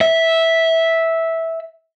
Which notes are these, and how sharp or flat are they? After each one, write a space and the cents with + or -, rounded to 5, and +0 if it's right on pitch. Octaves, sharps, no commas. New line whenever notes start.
E5 -10